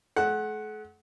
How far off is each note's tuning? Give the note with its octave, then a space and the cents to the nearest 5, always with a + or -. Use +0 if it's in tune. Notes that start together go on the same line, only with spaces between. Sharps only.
A3 -45 F#5 +5